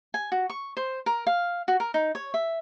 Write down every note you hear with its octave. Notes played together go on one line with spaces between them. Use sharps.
G#5
F#4
C#6
C5
A#4
F5
F#4
A#4
D#4
C#5
E5